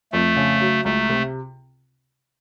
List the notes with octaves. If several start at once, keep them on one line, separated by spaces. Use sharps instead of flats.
F2 A3
C#3
F#3
C#2 A3
C3